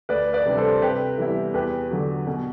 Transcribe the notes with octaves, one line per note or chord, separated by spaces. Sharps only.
D2 B4 D5
B4 D5
C3 G3 D4
A4 C5
C3 G4 B4
E3 G3 B3 E4
E2 G4 B4
D3 F#3
B2